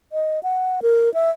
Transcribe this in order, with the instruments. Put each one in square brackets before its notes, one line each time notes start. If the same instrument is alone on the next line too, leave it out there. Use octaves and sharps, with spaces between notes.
[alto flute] D#5
F#5
A#4
E5